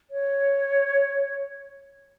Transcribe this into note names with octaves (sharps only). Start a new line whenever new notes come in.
C#5